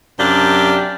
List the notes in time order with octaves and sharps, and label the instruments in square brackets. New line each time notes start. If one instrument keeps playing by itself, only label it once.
[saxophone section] F#2 C3 D4 G4 F5